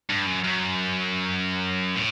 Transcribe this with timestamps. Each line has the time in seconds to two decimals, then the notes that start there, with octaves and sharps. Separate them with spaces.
0.09 G2
0.26 F#2
0.44 F#2
1.96 A2